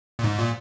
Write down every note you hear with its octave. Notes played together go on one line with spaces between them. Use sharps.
A#2
G#2
A#2